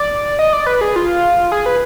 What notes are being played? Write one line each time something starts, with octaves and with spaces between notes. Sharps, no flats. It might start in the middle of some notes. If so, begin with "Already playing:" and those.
Already playing: D5
D#5
D5
B4
G#4
F4
G#4
B4